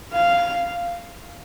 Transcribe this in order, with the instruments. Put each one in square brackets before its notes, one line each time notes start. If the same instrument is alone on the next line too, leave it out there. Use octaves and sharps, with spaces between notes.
[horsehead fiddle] F5